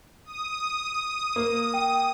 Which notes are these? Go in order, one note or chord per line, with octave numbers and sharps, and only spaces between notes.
D#6
A#3
G5